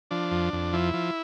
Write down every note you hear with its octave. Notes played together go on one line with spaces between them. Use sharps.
F3 D4
F2
F2
F3 E4
F3